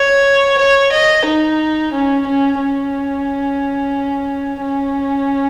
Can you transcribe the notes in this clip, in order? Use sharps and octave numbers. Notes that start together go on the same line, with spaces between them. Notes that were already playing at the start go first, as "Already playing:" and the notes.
Already playing: C#5
C#5
D#5
D#4
C#4
C#4
C#4
C#4